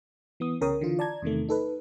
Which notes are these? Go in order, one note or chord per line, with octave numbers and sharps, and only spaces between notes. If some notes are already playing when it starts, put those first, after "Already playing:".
E3 B3 D#6
C2 C#3 A#4 C#5 G5 D#6
D3 E3 F4
D5 A5 A#5 G#6
E2 C3 D#3 A3
D#4 A4 B4